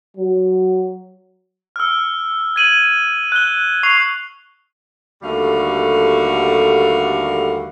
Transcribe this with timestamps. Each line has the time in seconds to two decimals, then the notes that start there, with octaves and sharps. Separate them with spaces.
0.17 F#3
1.76 E6 F6
2.56 G#6 D#7 F#7
3.32 F#6 G7
3.83 C#6 C7 F7
5.22 D#2 D3 G3 A3 F#4 F5